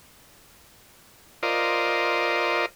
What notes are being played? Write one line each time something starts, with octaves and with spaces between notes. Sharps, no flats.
F4 A#4 C5 D5 D#5